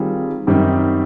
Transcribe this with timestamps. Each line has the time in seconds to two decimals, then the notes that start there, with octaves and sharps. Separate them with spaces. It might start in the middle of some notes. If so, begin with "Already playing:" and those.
Already playing: D#3 G3 C4 F4 G#4
0.47 F#2 D#3 G3 C4 D#4